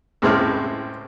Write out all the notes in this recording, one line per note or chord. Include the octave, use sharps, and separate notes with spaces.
C#2 A2 G#3 C4 E4 F6